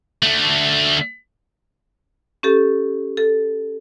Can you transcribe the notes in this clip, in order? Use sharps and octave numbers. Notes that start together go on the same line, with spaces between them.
D3 A3
C#4 G4 A4
A4